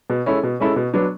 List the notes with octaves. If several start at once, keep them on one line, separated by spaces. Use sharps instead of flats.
B2
G#3 C#4 E4 A4
B2
G#3 C#4 E4 A4
B2
F#3 B3 D4